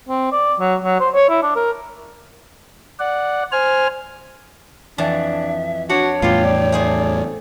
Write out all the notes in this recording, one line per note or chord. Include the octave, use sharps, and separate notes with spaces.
C4
D5
F#3
F#3
C5
C#5
E4
D4
A#4
D5 F#5
C5 G#5 F6
F2 E3 D4 E5 A5
D4 F#4 C#5
E2 A2 B3 F4 G4
D5
A3 G#4 C5